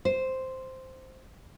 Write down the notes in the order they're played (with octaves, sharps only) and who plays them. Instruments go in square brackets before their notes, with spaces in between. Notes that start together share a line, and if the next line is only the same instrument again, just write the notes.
[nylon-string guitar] C5